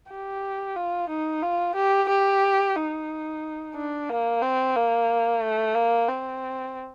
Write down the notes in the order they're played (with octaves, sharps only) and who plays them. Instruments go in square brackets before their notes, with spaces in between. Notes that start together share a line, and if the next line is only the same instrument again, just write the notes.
[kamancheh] G4
F4
D#4
F4
G4
G4
D#4
D4
A#3
C4
A#3
A3
A#3
C4